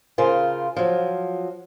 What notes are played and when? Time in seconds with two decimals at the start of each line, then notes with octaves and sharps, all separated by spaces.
0.18 C#3 F4 A#4 C5
0.77 F3 F#3